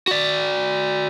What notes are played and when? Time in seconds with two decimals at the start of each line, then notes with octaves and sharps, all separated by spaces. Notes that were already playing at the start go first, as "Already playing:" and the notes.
0.08 F#4 D5